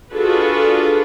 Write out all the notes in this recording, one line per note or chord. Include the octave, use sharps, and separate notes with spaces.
D4 F4 F#4 G#4 A4 B4